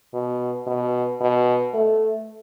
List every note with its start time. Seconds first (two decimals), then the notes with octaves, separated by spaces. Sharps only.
0.14 B2
0.67 B2
1.21 B2
1.74 A3